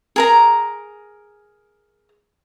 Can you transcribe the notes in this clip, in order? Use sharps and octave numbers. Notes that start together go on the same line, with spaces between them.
G#4 A#4 A#5